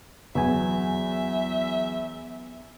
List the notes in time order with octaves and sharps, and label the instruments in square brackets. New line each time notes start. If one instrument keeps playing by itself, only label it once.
[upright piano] E2 [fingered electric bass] F#3 [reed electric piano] B3 G#5 [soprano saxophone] E5